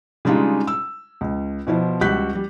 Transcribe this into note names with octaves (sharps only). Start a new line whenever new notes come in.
C#3 G3 G#3 D4 D#4 F4
E6
C#2
B2 F3 E4 C5
C#2 G3 F#4 F#6 G6 B6
G3